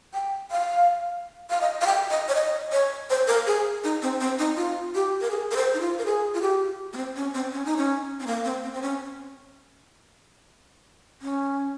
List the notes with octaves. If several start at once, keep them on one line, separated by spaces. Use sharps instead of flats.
G5
F5
F5
D#5
F5
G5
D#5
C#5
D#5
C#5
C5
A#4
G#4
D#4
C4
C4
D#4
F4
G4
A#4
G#4
A#4
C5
D#4
F4
A#4
G#4
F4
G4
A#3
C4
C#4
C4
C#4
D#4
C#4
C4
A#3
C4
C4
C4
C#4
C#4